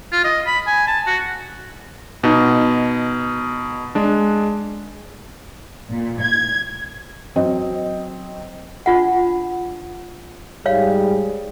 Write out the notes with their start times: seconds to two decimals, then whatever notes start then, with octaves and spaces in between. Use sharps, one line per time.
0.12 F4
0.24 D#5
0.47 B5
0.67 G#5
0.87 A5
1.07 F#4
2.24 B2 D#4
3.95 G#3 D4
5.89 A#2
6.20 G#6
7.36 F#3 C4 D#5
8.86 D4 F4 F#5
10.66 G#2 G3 G#4 C#5 F5